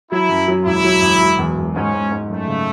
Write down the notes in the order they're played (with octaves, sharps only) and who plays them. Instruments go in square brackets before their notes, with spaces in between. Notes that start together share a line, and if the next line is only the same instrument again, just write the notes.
[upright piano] F#3 [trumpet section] E4
[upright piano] F#2
F#3
[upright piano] E1 [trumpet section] E4
[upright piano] F#3
E1
E1
E2
E1
[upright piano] G#2 [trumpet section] C#4
[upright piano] G#2
G#2
[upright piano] F#2 [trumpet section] A3
[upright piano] C#3